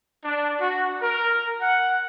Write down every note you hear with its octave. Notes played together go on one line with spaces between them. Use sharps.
D4
F#4
A#4
F#5